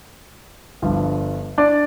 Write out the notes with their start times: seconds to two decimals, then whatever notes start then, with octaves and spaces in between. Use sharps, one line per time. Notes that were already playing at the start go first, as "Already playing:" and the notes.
0.82 G1 G2 D3 F3
1.58 D4 D5